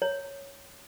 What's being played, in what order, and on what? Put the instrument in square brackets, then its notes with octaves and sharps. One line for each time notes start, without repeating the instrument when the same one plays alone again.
[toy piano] C#5